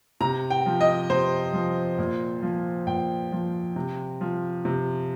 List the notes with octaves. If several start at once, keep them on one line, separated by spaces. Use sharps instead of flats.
C3 A#5
G5
F3
D#5
C3 C5
F3
A#2
F3
A#2 G5
F3
C3
F3
C3